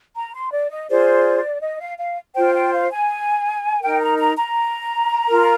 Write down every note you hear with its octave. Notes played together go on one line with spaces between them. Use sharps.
A#5
C6
D5
D#5
F4 G#4 C5 D5
D#5
F5
F5
F4 C5 G5
G5
F5
G#5
D#4 A#4 G5
A#5
A#5
A#5
F4 A#4